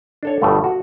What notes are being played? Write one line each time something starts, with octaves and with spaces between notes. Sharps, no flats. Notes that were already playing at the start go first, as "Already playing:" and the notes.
D4 A4 C#5
G1 G2 B2 A3
F#4